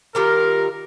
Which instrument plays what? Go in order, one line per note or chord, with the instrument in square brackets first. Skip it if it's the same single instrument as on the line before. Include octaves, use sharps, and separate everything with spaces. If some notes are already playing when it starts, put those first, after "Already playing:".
[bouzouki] D#3 G3 F4 [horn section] A#4